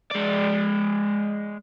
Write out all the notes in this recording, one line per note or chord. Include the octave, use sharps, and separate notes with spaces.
G#3 D5